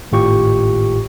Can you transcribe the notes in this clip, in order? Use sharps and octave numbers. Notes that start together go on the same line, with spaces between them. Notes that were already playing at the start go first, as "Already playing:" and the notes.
G#1 A2 F4 G4 C#6